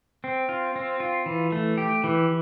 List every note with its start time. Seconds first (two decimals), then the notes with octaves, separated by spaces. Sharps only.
0.24 C4
0.49 F4
0.76 C4
1.00 F4
1.26 E3
1.52 A3
1.78 G4
2.04 E3